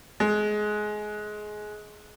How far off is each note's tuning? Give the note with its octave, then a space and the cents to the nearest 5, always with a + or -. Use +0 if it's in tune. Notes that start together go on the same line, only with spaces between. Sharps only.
G#3 +20